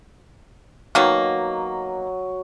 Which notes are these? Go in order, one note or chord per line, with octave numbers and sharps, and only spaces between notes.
B2 D#3 F#3 A#3